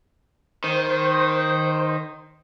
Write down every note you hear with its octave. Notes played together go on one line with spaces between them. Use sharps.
D#3 C5